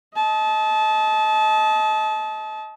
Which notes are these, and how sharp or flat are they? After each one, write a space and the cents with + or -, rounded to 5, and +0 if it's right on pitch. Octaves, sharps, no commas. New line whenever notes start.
D#5 +30 A5 -25